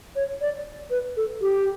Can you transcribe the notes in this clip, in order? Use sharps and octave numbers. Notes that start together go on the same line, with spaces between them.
C#5
D5
B4
A4
G4